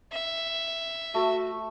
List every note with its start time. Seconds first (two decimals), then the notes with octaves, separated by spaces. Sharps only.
0.12 E5
1.14 A3 F#4